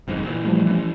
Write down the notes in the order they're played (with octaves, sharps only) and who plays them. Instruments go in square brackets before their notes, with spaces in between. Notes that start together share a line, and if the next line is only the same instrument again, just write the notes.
[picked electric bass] G1 F2 G#2
A#2 E3
[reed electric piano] F3 G3 A3
[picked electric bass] E3 C#4